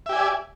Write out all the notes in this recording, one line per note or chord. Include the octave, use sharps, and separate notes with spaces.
G4 D5 E5 G#5